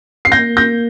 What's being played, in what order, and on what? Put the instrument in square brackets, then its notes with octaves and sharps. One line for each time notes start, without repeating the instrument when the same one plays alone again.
[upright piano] C7
[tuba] A#3 [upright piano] G6 A#6
[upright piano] G6 A#6